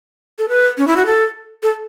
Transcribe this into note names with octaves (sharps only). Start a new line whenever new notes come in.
A4
B4
C#4
E4
F#4
A4
A4